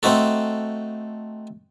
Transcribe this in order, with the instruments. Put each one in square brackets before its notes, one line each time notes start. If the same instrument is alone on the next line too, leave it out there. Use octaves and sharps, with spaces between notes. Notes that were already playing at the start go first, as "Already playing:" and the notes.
[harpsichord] A3 C4 D#4 F#4 A4